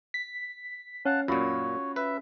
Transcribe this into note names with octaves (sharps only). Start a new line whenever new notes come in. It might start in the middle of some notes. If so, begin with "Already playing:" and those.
B6
C#4 F5 F#5 A5
F#2 A#2 F4 F#4 C#5 B5
B4 E5